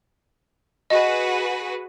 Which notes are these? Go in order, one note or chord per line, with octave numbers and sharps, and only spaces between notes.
F#4 G#4 B4 D#5